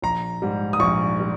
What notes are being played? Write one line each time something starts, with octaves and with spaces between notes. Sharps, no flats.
A#1 A#5
G#2 G3
D#6
A#1 C#6
G3